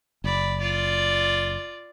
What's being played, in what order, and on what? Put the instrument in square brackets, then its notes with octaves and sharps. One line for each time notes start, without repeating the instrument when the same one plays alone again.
[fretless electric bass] F#1 [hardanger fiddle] D5 B5
[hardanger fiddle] F4 D5